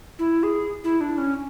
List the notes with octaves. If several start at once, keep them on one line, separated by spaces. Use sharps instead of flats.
E4
G#4
E4
D4
C#4